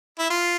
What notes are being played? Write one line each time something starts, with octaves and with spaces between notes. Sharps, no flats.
E4
F4